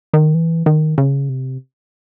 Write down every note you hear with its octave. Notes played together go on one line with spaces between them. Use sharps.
D#3
E3
D#3
C#3
C3